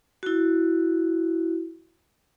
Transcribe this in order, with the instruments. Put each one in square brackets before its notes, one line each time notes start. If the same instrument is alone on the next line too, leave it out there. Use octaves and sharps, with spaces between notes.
[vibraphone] E4 F#4